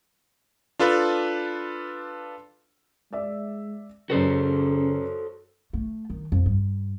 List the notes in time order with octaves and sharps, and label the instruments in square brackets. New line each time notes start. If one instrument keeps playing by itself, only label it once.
[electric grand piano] D4 F4 A4 B4
[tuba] G#3 [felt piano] D5 E5
[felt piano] F#2 B4 [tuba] C#3 [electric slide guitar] F#4 A4 C5
[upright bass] A3
D#3
F2
G2